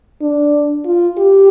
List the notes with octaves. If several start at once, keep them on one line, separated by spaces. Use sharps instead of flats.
D4
F4
G4